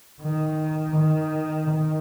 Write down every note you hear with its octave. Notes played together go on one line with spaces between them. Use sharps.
D#3
D#3
D#3